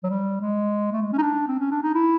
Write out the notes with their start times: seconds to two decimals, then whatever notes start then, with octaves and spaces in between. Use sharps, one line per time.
0.04 F#3
0.10 G3
0.41 G#3
0.92 A3
1.02 G#3
1.13 C#4
1.18 D#4
1.22 D4
1.48 C4
1.59 C#4
1.71 D4
1.83 D#4
1.95 E4